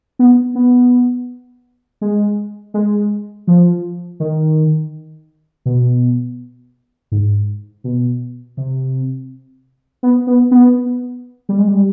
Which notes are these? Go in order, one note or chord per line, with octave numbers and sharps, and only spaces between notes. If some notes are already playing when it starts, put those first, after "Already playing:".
B3
B3
G#3
G#3
F3
D#3
B2
G#2
B2
C3
B3
B3
B3
G3
G#3
G3